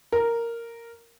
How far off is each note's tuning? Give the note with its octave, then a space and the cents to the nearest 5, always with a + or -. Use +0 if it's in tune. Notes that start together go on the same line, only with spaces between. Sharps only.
A#4 -5